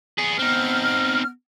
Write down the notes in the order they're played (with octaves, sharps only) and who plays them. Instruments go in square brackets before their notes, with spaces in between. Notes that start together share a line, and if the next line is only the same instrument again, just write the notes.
[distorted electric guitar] B3 G#4
[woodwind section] B3 F6 [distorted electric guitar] C4 D#4